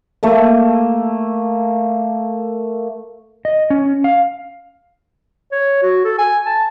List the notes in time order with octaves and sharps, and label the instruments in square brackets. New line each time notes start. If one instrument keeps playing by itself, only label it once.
[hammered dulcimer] A3 A#3
[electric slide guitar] D#5
C#4
F5
[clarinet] C#5
F#4
A4
G#5
A5